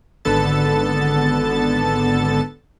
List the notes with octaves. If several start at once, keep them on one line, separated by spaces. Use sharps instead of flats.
G#1 D3 B3 A4 A5 A6